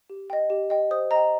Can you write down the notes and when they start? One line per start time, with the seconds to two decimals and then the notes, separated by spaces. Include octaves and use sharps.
0.10 G4
0.30 D#5 G5
0.50 G4
0.70 D#5 G5
0.91 C5 D#6
1.11 D#5 G5 A#5